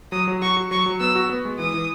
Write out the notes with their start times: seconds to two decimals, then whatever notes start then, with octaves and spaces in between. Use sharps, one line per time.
0.12 F#3 D#6
0.28 F#3
0.42 F#4 C#6
0.57 F#4
0.71 F#3 C#6
0.86 F#3
1.00 B3 E6
1.15 F#4
1.29 B3
1.45 G#3
1.59 E3 D#6
1.74 E3